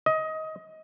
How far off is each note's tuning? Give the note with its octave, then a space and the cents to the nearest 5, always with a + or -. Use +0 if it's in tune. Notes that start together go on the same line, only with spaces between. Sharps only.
D#5 +20